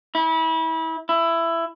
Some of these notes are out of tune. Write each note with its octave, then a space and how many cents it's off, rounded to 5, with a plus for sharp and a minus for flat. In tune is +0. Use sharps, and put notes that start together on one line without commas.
E4 -30
E4 +15